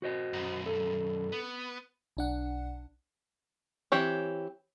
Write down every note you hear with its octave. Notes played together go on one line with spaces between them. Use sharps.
F#4 C5 D#5
B1 F#2
A4
B3
B1 D4 F#5
E3 C4 G4 C#5